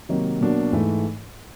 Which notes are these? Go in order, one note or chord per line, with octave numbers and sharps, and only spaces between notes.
C3 D#3 F#3 A#3 D#4
B2 F#3 A#3 D4 F#4
G#2 E3 A3